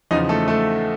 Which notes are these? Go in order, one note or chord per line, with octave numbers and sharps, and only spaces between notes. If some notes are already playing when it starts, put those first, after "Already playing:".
E2 C#3 F3 D#4 D#5
A3 A4
A3 A4